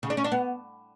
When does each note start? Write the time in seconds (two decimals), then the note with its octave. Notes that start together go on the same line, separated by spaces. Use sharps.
0.03 C#3
0.10 D4
0.17 C#4
0.24 D4
0.32 B3